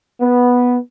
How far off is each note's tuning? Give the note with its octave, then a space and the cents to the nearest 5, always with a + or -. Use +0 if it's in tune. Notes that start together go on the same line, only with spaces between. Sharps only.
B3 -5